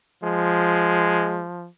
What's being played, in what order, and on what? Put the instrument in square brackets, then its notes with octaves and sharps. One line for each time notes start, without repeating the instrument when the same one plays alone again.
[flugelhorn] F3 [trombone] G#3